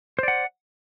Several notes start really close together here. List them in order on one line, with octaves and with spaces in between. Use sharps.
C5 D5 F#5